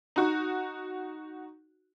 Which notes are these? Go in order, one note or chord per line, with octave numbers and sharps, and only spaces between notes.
D#4 F#4